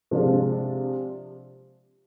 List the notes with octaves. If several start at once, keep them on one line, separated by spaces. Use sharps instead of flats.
C3 F3 G#3 D4 F4